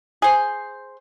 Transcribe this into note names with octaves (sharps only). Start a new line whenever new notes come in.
G#4 C5